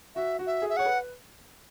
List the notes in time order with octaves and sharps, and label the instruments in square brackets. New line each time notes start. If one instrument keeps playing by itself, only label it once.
[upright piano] F#4 [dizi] E5
[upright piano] F#4
[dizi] E5
[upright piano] G#4
[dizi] E5
[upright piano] C#5 [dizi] F#5
[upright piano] B4